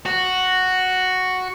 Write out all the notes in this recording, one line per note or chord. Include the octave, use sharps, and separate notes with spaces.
F#4